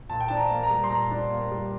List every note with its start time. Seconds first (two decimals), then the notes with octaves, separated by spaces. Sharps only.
0.10 A#2 A5
0.20 G5
0.28 D4 A5
0.37 A#5
0.50 A#3
0.63 A#5
0.70 G3
0.84 C6
0.90 A#2 A#5
1.11 D4
1.30 A#3
1.51 G3